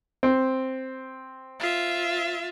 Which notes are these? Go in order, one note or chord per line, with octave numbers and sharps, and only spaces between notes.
C4
F4 E5